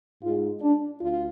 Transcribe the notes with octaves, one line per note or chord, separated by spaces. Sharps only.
G#2 G#3 F4
D4
D2 F4